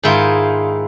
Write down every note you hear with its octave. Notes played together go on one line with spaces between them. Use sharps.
G#2 D#3 E4 F4